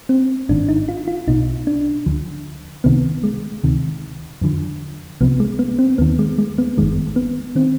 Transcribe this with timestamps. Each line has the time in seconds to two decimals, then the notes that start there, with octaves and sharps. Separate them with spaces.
0.09 C4
0.49 G#1 G#2 D#3 D4
0.69 D#4
0.88 F4
1.08 F4
1.27 B1 B2 D#4
1.67 D4
2.06 D2 D3 F3
2.84 C2 C3 D#3 B3
3.24 G#3
3.64 D2 C3 D#3
4.41 F2 D3 F3
5.21 C2 C3 F3 B3
5.40 G#3
5.59 B3
5.79 C4
5.98 D#2 D#3 B3
6.19 G#3
6.38 G#3
6.58 B3
6.77 G1 F2 D#3 G#3
7.16 B3
7.55 D#3 C4